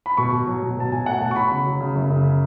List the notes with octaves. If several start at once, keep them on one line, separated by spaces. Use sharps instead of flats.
B5
B2 C#6
B2
F#3
B2
B2 A5
B2 G#5
A3 F#5
B2 A5
C#6
F#3 B5
C#3
F#3
C#3
F#2
C#3